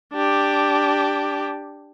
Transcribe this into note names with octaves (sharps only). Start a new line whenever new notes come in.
D4 G4